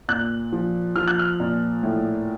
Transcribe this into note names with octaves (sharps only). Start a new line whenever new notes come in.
A#2 F#6
F3
F3 F6
F#6
F6
A#2
A2